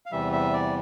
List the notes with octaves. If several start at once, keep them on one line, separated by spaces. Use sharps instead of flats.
F5
E2 C3 E3 G3 E5
E5
D5